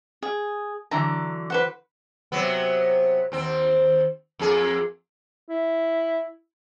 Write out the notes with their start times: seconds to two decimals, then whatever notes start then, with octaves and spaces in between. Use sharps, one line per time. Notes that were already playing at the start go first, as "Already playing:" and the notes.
0.23 G#4
0.91 D3 E3 F#3 A#5
1.50 B4 C5 F#5
2.32 C3 F#3 B3
3.32 D#2 C4
4.39 F2 A#3 G#4
5.49 E4